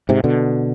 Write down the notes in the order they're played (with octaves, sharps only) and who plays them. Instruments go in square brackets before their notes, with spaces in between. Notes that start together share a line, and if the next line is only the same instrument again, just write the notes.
[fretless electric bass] G#2 C3
B2 D3